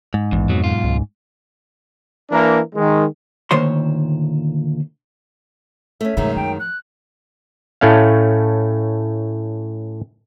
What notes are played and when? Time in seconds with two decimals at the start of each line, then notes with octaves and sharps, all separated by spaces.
0.14 G#2
0.32 A#1 E2
0.49 F2 B2 F#3
0.64 B1 F4
0.84 C#2
2.30 E3 A#3 D4 A#4
2.74 D#3 G#3
3.51 D2 A#2 D#3 C5 C#5 C6
6.01 A3 C#4 E5
6.17 F#2 B2 D#3 F3 G#3
6.36 F3 G5
6.59 F#6
7.81 A2 A3 C#4 F5